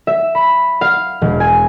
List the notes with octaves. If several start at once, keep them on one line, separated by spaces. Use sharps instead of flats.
E5
B5
F5
E1
G#5